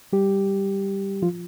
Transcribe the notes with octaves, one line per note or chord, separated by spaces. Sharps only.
G3 G4
F3 F4